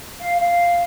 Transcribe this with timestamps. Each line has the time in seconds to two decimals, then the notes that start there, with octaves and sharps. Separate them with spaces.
0.19 F5
0.40 F5